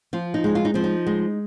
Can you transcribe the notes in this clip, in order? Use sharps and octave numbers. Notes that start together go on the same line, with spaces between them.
F3 F4
D#4
G#3
F4
D#4
F3 C4
D#4
G#3